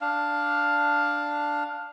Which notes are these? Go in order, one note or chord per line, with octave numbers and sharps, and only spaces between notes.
D4 F5